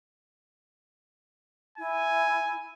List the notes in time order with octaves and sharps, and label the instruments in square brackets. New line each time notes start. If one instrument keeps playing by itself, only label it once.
[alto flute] E4 [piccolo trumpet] G#5